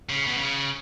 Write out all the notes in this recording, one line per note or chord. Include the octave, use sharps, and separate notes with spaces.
C#3
B2
C#3